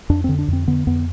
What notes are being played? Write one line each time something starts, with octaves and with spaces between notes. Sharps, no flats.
F2 D4
D3 C4
D4
F2 C4
D3 B3
F2 B3